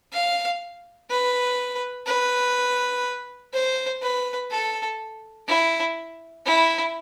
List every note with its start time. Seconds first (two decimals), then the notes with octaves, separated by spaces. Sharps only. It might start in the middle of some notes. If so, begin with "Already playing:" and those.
0.13 F5
1.10 B4
2.07 B4
3.54 C5
4.02 B4
4.51 A4
5.48 E4
6.46 E4